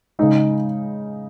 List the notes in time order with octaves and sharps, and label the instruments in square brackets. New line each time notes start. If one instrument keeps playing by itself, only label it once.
[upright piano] C#3 G#3 D#4